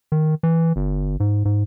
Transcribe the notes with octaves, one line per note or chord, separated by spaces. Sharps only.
D#3
E3
G1
G#2
G#2